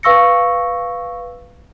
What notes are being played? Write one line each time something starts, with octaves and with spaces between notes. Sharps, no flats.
B4 F5 C#6 E6 A#6 C#7